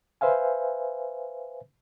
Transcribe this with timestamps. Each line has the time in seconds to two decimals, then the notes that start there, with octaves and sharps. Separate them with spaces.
0.21 B4 C5 E5 F5 G#5